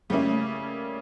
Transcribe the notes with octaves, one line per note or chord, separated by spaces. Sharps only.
C#3 G3 A3 A#3 C#4 E4